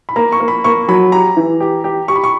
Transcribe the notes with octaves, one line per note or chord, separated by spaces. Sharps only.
B5
A#3 A#5
C#6
A#3
B5
A#3 C#6
F#3 B5
G4 A#5
E3
G4
G4
G4 C#6
B5
C#6